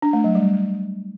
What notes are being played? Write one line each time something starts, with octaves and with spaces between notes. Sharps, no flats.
D4
A3
F#3
G3